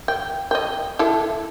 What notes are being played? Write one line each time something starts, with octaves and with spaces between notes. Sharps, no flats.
G5
D#5 G5
E4 A4